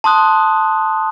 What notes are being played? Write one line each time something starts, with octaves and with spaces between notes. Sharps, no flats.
A5 C6 D#6 F#6